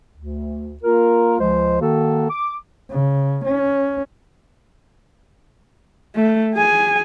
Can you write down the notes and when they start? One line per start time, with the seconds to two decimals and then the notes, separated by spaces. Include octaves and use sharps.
0.16 D2
0.84 A#3 F4 A#4
1.40 C#2 F3 G#3 C5
1.81 D#3 A#3 F#4 A4
2.30 D6
2.90 C#3
3.44 C#4
6.16 A3
6.55 G#4 G#5